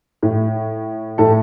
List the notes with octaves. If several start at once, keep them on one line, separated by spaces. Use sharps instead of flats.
A2
A2 A4